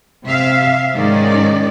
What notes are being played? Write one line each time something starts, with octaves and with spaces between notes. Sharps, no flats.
C3 E5 F5
G#2 D#3 G#3 C#4 D#4 D5